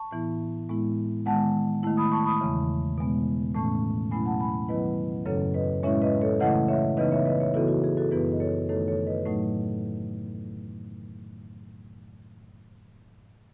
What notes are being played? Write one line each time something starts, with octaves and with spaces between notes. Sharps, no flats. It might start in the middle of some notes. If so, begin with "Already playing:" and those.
Already playing: A5 C#6
A2 E3 B3 E4
A2 G#3 B3 E4
D#3 G#3 B3 F#5 A5
D#3 A3 E4
B5 D#6
A5 C#6
B5 D#6
E2 C#3 E3
B2 G#3 B3
A2 E3 A3 C#4 A5 C#6
B2 F#3 A3 C#4 E4 G#5 B5
F#5 A5
G#5 B5
D#3 F#3 B3 E4 B4 D#5
F#2 C#3 F#3 C#4 A4 C#5
B4 D#5
A2 G#3 C#4 E4 C#5 E5
B4 D#5
A4 C#5
C#3 E3 A3 E4 D#5 F#5
C#5 E5
C#3 E3 B3 D#4 B4 D#5
C#5 E5
B4 D#5
C#5 E5
C#3 E3 B3 E4 F#4 A4
F#4
G#4
F#4 A4
F#2 E3 B3 E4 G#4 B4
D#5
A4 C#5
F#2 D#3 A3 D#4 A4 C#5
A4 C#5
B4 D#5
A2 F#3 A3 D#4